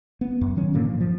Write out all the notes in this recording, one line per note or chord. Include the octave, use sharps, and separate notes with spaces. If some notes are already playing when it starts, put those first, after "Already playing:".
B3
F#2
D#3 F#3 C#4
G2 A#2 D3 A#3
F3
F3